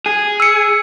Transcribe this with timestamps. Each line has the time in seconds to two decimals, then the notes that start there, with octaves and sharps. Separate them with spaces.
0.06 G#4
0.40 E6 C#7